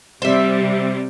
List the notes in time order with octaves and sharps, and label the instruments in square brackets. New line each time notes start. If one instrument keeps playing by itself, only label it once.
[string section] C3 G3 [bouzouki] C5 E5